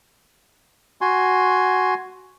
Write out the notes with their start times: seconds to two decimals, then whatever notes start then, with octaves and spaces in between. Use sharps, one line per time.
1.01 F#4 G#5 C6